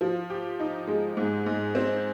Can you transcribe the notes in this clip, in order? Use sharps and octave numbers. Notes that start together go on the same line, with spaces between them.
F3
G4
D#4
G#3
G#2
G#2
C4